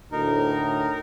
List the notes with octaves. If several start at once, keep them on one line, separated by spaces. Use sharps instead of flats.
D2 A2 D#4 A#4